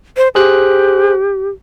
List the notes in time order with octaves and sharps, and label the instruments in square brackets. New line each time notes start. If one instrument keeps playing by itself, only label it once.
[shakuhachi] C5
[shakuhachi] G4 [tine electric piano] G#4 C5 F#6